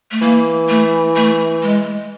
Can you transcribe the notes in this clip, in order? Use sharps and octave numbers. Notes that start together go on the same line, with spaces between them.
A3
E3 A#3
A3
A3
G#3